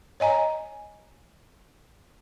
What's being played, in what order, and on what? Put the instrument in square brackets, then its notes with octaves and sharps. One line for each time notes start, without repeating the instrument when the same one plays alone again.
[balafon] C#5 D#5 G#5 A#5